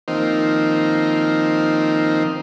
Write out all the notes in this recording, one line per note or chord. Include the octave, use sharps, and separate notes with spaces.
D#3 F3 A#3 C4 D#4